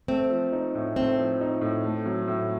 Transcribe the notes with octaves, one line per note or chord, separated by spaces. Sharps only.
A3 C4
F3
D#4
A2
A3 C4
F3
D#4
A2
A3
F#3
A2